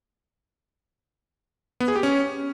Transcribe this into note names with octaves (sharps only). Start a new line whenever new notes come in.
B3
G#4
G4
C#4